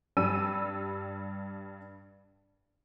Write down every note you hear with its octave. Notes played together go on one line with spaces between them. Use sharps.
G2 G3 E6 D#7